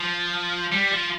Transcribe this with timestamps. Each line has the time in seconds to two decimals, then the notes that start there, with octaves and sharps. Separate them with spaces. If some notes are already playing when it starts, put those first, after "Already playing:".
Already playing: F3
0.72 G3
0.92 F3